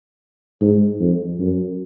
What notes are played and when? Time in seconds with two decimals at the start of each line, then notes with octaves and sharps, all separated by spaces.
0.61 G#2
1.00 F2
1.39 F#2